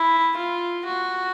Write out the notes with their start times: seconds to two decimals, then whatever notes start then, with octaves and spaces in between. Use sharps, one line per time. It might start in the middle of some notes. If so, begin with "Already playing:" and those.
Already playing: E4
0.37 F4
0.86 F#4